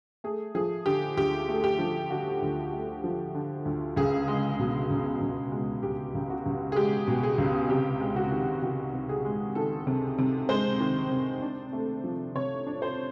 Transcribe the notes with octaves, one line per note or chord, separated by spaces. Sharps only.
A3 G#4
F3 G#4
D3 G4
D2 G4
A3
G4
F3
D3 F#4
D2
A3
F3
D3
D2
C#2 G#4
G#3
B2
C#2
C#2
G#3
B2 G4
C#2
F#4
C#2
G#4
G#3 G4
B2
G#4
C#2
C3 G4
G#3
F#4
D#3
C3 F#4
C3
G#4
G#3
D#3 A4
C3
C3
G#3 C5
D#3
C3
D4
A3
F3
C3 C#5
D4
C5